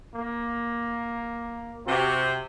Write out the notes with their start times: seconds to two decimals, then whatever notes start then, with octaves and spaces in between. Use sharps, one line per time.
0.15 A#3
1.87 C3 F#4